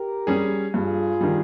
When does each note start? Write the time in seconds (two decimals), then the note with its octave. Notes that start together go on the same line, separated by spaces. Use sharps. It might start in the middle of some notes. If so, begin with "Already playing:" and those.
Already playing: G4 A#4
0.27 G3 C#4 G#4
0.74 G2 F4 G#4
1.21 D#3 G3